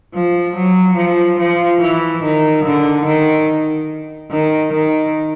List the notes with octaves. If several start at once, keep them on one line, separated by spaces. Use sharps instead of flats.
F3
F#3
F3
F3
E3
D#3
D3
D#3
D#3
D#3